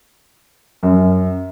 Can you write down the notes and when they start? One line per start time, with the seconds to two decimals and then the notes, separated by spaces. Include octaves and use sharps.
0.83 F#2